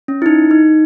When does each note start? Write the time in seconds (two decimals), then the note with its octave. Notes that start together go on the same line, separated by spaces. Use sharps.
0.08 C#4
0.22 E4
0.26 D#4
0.51 D#4